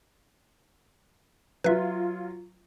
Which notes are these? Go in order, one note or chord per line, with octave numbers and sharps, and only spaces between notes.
F#3 F4 B4 E5